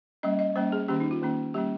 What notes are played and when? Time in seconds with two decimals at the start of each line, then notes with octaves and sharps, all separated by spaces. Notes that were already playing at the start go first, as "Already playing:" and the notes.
0.23 G3 A#3 C#4 D#5
0.39 D#5
0.56 G3 A#3 C#4 C5
0.72 G#4
0.88 D#3 A#3 C#4 G4
1.00 D#4
1.11 F4
1.21 D#3 A#3 C#4
1.54 G3 A#3 C#4 G4